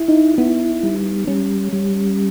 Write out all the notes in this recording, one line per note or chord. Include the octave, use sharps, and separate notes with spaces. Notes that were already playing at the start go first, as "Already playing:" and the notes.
Already playing: E4
D#4
B3 E4
G3
G3 C#4
G3